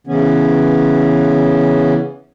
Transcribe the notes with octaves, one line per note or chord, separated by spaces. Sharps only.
C#3 E3 B3 C#4